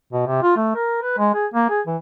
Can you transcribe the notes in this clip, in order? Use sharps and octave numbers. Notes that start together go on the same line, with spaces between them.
B2
C3
F4
A3
A#4
B4
G#3
G#4
A#3
G#4
E3